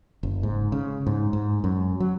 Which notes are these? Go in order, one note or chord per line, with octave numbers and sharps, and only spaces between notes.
F#1
G#2
C#3
G#2
G#2
F#2
F#3